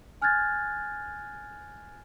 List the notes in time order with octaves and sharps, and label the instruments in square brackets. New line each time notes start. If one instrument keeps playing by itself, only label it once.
[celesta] G#5 F6 F#6 G#6 A6